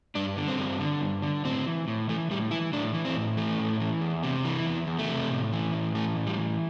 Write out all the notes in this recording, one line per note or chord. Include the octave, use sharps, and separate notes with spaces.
G2 D4
D3
C4
G2
D3
G2
D3
A2 C4
E3
A2
E3 A3
A2 G3
E3 E4
A2 D4
E3
C4
A2
E3 A3
A2
E3
E2
C3
E3
E2
E2
A3
C3
A2
E3
A2
E3 A3
A2
G3
E3